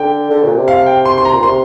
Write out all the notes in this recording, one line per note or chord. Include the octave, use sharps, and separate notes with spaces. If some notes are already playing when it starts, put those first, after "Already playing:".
Already playing: D3 G5
D3
A#2
C3
F5
G5
C6
C6
A#5
A#2
C3 C6